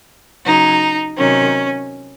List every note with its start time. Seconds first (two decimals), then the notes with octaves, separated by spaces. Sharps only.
0.45 C#3 F#3 D#4
1.17 C3 D#3 F#3 C#4